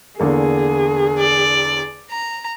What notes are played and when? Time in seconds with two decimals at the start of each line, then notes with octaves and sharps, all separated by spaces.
0.20 E2 D3 A#3 G#4
1.19 D5
2.10 A#5